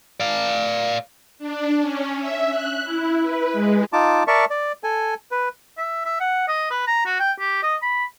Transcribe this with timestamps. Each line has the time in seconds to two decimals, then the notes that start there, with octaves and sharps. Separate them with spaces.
0.20 D5 F5
1.39 D4
1.81 C#4
2.18 E5
2.51 F#6
2.84 E4
3.23 B4
3.53 G#3
3.93 D#4 F4 A5 D6
4.27 A#4 D5 E5 A5 C#6
4.50 D5
4.84 A4 G#5
5.31 B4
5.78 E5
6.05 E5
6.20 F#5
6.48 D#5
6.71 B4
6.87 A#5
7.06 F#4
7.20 G5
7.39 G4
7.63 D#5
7.82 B5